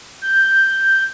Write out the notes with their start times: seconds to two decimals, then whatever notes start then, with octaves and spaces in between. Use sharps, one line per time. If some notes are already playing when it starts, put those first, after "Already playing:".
0.22 G6